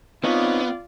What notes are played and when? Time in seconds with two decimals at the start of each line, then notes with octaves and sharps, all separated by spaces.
0.24 B3 C4 D#4 F4 C#5 D5